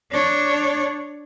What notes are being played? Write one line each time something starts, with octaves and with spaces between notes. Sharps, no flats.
D4 C#5